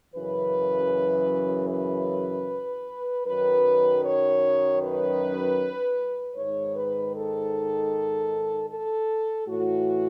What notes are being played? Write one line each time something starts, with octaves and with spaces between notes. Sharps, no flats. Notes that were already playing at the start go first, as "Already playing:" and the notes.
F#2 C#3 E3 B4
B4
F#2 D#3 B4
C#5
B4
G#2 D#3 C#5
B4
A4
A4
A2 E3 F#4